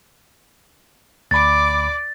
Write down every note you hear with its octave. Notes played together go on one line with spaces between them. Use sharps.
D2 D5 B5 D6 A6